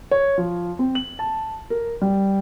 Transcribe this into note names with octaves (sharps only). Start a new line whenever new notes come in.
C#5
F3
C4
F#7
A5
A#4
G3